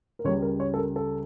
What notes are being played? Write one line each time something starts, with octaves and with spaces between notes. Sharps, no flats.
A#4
C#2 C#3 G3 C#5
A#4
C#5
A4
A#4
A4